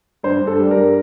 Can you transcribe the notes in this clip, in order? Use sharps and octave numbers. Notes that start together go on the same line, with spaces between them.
G2 C5
G2
A4
G3
A#4
G2